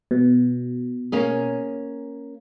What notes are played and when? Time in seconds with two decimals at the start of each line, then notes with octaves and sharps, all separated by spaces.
0.11 B2
1.12 A#3 C#4 G#4